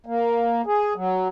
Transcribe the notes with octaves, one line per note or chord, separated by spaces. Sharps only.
A#3
G#4
F#3